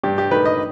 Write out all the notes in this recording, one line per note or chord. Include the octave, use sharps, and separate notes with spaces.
G2 G4
G4
D#3 A3 D#4 B4
D#5